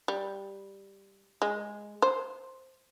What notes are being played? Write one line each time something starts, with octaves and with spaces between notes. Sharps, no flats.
G3
G#3
C5